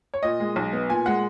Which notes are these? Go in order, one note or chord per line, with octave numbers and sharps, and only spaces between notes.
C#5
A#2 D#5
G#3
B1
B3
A#2 G#5
G#3 F#5